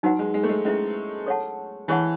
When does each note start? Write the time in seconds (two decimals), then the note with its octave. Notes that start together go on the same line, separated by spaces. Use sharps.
0.03 F#3 D#4 F#4 B4 F#5
0.19 G#3
0.34 G#3
0.43 A3
0.49 G#3
0.65 G#3 C#4 E4 B4 E5
1.26 A4 C#5 F#5 A5
1.88 E3 E4 G#4 C#5 F#5 A5